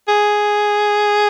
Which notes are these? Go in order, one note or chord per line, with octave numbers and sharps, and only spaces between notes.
G#4